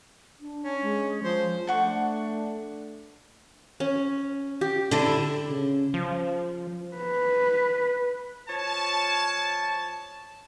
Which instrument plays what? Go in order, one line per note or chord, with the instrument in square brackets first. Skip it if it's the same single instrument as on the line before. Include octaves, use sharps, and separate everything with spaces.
[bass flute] D4
[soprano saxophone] C#4
[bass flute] G#3
[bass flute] F3 [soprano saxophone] C5
[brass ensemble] A3 D4 [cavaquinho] A4 F#5 C#6
[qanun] C#4
G4
[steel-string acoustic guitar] D3 E4
[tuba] C#3
[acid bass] F3
[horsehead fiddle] B4
[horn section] F3 C#5 A5